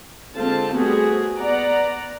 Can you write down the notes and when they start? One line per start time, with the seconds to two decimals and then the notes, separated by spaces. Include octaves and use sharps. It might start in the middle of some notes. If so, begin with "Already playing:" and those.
0.34 D3 G#3 C4 F4 C5 A5
0.75 G3 A3 B3 C4 F#4 G#4
1.37 B3 D5 F#5 A#5